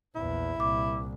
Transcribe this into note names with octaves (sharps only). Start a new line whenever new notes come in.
A#1 E2 E4
C2 A#2 D6